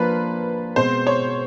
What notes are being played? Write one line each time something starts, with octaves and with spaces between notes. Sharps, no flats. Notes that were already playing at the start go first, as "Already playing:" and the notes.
Already playing: F3 A#3 D4 F4 B4
B2 G#3 C4 C5
C#5